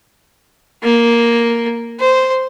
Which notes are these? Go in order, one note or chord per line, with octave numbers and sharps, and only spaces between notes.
A#3
C5